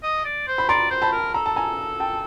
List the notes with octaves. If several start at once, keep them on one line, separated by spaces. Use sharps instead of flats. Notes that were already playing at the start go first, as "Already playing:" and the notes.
D#5
D5
C5
B5
D5 A#5 C6
C5
A5 B5
A#4
A4 A#5
A5
G#5 A#5
G5 A5